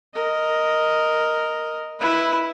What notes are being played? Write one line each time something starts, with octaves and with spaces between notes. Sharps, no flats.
A#4 D#5
E4 B4